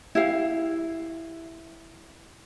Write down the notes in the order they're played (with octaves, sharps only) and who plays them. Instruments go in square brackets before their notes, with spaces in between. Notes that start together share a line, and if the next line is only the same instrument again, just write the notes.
[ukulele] E4 G4 F5